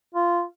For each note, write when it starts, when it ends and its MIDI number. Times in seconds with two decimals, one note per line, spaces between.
0.15 0.42 65